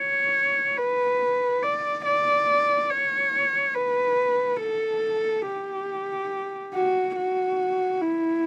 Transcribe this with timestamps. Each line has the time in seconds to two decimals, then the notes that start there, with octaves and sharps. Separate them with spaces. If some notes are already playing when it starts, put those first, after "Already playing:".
Already playing: C#5
0.77 B4
1.63 D5
2.05 D5
2.90 C#5
3.75 B4
4.61 A4
5.46 G4
6.74 F#4
7.16 F#4
8.01 E4